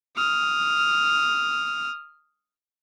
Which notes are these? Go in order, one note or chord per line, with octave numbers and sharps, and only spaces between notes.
D#6 F6